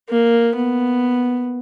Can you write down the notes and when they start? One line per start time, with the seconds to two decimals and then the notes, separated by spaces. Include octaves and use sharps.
0.09 A#3
0.56 B3